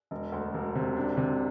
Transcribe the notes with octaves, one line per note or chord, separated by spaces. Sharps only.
E1
D2
E1
C3
D4
C3